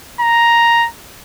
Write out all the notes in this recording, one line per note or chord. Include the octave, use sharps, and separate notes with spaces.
A#5